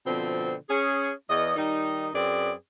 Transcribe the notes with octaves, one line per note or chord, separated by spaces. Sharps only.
B2 D3 F3 C4
C#4 G#4
E2 D#5
D#3 G3 D#4
F#2 C4 G#4 B4 D5